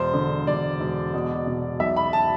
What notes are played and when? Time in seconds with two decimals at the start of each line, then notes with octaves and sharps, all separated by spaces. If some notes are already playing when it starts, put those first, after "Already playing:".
Already playing: E1 C5
0.13 D3
0.47 E1 D5
0.80 E1
1.13 B2
1.47 B2
1.80 B1 E5
1.96 B5
2.13 A5